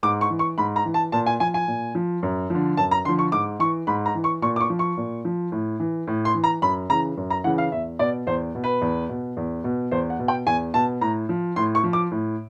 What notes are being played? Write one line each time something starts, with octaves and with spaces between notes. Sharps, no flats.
G#2 D6
C#6
E3
C#6
G#2 B5
A#5
E3
A5
A#2 A5
G#5
F3 G#5
G#5
A#2
F3
F#2
D3 F3
F#2 A5
A#5
D3 F3 C6
C#6
G#2 D6
E3 C#6
G#2 B5
A#5
E3
C#6
A#2 C#6
D6
C#6
F3
C#6
A#2
F3
A2
E3
A2
C6
E3
A#5
F#2 B5
C#3 E3 A#5
F#2
A#5
C#3 E3 F#5
F5
E2 E5
B2 D5
E2 C5
B2
B4
E2
B2
E2
B2
E2 C5
F#5
B2
G5
E2 G#5
B2 A5
A2 A#5
F3
A2 C6
C#6
F3
D6
A2